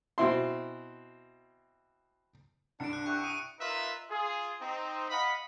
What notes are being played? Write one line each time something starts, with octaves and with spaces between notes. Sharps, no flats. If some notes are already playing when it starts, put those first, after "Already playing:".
B2 C4 E4 C6
C2 G2 D4 C#7 D7
F#6
G4 E5 F#5 C#6
D#6 C#7 D#7
D#4 F4 A#4 B4 E5
F4 G#4
C4 D#4
D#5 F5 F#5 B5